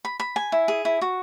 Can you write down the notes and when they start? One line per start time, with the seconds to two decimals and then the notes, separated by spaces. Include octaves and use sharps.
0.05 B5
0.20 B5
0.36 G#5
0.52 E4
0.68 G#4
0.85 E4
1.02 F#4